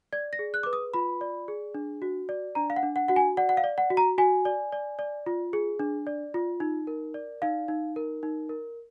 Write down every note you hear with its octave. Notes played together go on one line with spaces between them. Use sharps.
D5 G#6
A#6
G#4
F#6
B4 D6
D#6
F4 B5
D5
G#4
D4
F#4
D5
D4 A#5
F5
F#5
D4
F#5
F#4 F#5
G#5
D5 F#5
F#5
F5
D5
F#5
F#4
A#5
F#4 G#5
D5
D5
D5
F4
G#4
D4
D5
F4
D#4
A#4
D5
D#4 F5
D#4
A#4
D#4
A#4